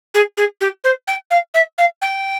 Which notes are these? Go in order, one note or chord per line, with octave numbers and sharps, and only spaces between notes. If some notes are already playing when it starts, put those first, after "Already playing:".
G#4
G#4
G4
C5
G5
F5
E5
F5
G5